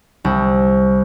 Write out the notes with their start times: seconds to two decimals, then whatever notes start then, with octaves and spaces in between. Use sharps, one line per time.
0.25 C2